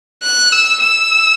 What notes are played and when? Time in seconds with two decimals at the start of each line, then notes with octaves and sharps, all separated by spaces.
0.23 F#6
0.52 E6
0.80 E6